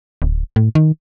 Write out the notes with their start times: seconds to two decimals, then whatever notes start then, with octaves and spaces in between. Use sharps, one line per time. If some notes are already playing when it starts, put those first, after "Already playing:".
0.22 D1
0.56 A2
0.75 D#3